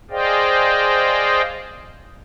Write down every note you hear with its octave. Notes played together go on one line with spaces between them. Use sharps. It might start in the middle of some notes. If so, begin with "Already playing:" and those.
G#4 C5 D5 D#5 F5 G5